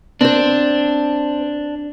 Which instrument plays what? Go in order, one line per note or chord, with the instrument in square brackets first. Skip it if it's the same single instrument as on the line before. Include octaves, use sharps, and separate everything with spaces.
[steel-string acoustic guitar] C4 C5 [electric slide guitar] D4